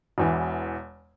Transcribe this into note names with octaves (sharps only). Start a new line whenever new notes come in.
E1 E2 E3